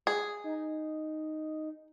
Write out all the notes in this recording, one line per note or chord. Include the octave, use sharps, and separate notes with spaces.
G#4
D#4